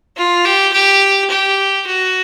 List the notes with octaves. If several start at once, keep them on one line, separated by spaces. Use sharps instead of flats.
F4
G4
G4
G4
F#4